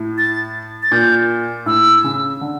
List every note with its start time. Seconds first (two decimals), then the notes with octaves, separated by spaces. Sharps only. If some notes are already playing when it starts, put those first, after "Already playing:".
Already playing: A2
0.18 A6
0.83 A6
0.91 A#2 G6
1.66 A2 E6
2.04 C#3
2.41 D3